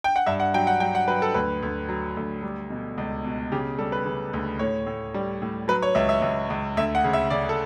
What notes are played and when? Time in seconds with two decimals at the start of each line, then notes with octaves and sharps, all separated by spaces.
0.04 G5
0.16 F#5
0.26 G2 E5
0.40 F#5
0.54 F#3 G5
0.67 F#5
0.80 F#3 G5
0.95 F#5
1.08 F#3 B4
1.22 A4
1.34 D2 B4
1.63 D2
1.89 F#3
2.17 D2
2.43 G3
2.70 B2
2.98 C#2
3.24 B2
3.52 C#3 G4
3.79 G3 A4
3.92 B4
4.06 C#3
4.33 D2
4.59 A2 C#5
4.87 A2
5.14 G3
5.42 A2
5.68 F#3 B4
5.82 C#5
5.95 C#2 E5
6.09 E5
6.22 C#2
6.50 C#2
6.77 D2 E5
6.95 F#5
7.04 C#3
7.13 E5
7.30 C#3 D5
7.49 A4